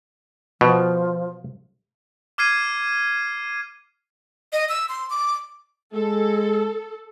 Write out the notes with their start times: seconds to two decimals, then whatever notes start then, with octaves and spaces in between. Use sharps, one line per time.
0.61 B2 F3
2.38 D6 F6 G#6 C7 D#7
4.53 D#5
4.69 E6
4.89 C6
5.10 D6
5.93 G#3 A4